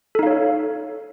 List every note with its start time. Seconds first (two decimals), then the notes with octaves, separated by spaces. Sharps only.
0.15 A4
0.19 D#4
0.23 F5
0.27 C#5